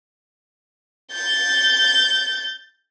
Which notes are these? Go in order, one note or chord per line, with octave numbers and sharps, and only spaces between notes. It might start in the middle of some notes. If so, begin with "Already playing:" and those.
G6 A6